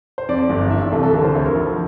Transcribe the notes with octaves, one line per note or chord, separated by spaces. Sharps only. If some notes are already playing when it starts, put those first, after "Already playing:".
C5
F2 D5
G1
E3 E5
E5
C2 A4
A4
D3 A#4
C5
D2 E5
A#4
F3